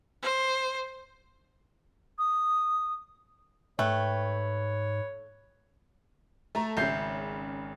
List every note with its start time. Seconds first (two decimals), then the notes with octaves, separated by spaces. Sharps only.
0.22 C5
2.18 D#6
3.79 G#2 A3 B4 C#5 G5
6.55 A3 A4 A5 A#5
6.77 G#1 C#3 E5 G6 C7